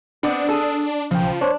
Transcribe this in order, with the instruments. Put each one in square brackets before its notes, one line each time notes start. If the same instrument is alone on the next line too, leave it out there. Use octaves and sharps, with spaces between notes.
[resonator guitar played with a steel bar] B3 C4 D5 [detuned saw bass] D4
[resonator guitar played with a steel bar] G#4 A4
[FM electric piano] B1 G5 [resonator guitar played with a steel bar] C#3 [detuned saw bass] F3
[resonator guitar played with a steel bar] D4 [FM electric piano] C5 C#5